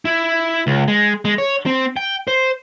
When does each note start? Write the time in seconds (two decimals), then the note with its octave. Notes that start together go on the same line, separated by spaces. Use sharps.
0.05 E4
0.67 C#2
0.88 G#3
1.25 G#3
1.38 C#5
1.66 C4
1.97 G5
2.28 C5